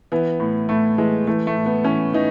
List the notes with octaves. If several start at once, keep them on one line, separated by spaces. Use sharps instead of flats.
E3 B3
A2
A2 A3
E3 G#3
E3 A3
A3
A2
B3
E3 C#4
E3 D#4